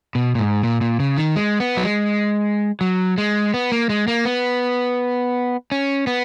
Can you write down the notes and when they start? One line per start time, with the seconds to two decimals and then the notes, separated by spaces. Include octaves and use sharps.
0.15 B2
0.35 A#2
0.39 G#2
0.63 A#2
0.81 A#2
1.00 C#3
1.18 D#3
1.36 G#3
1.60 B3
1.77 F#3
1.84 G#3
2.81 F#3
3.18 G#3
3.54 B3
3.72 A#3
3.89 G#3
4.08 A#3
4.25 B3
5.72 C#4
6.07 B3